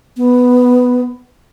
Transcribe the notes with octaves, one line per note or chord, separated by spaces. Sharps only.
B3